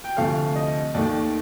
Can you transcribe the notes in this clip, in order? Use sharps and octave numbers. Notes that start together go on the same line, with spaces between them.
G5
D2 C3 F3 A3 F5
D#5
D#2 D#3 A3 D5